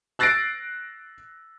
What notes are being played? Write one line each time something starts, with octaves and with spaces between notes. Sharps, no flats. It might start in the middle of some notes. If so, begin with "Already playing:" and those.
E6 F#6 A6 A#6 C7 D7